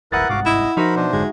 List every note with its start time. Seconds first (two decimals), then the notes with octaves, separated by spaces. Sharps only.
0.12 D#1 G#1 E4 A#4 B4 F#5 D#6 A6
0.29 G1 C2 G#2 F#4 F5 D6
0.46 E4 D#5
0.77 F3 D#4 F#4 A#4 C5 E5 B5
0.96 B2 D4 C5
1.13 F1 G#2 D3 G#3